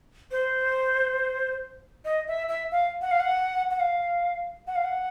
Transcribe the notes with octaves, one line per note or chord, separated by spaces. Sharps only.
C5
D#5
E5
E5
F5
F#5
F5
F#5
F#5
F5
F#5
F5
F#5